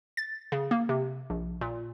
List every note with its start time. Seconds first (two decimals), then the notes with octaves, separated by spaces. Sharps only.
0.17 A6
0.52 C#3
0.71 A#3
0.89 C3
1.30 A#1
1.61 A#2